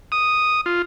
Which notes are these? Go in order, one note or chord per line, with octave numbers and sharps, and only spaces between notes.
D#6
F4